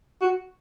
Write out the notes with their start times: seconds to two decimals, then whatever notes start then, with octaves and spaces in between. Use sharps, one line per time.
0.21 F#4